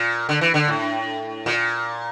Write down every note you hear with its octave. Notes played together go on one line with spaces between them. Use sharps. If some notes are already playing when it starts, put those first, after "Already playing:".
Already playing: A#2
D3
E3
D3
A2
A#2